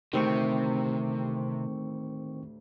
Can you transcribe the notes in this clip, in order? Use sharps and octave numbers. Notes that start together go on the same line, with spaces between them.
D2 A2 C3 D#3 C4 G4 C#6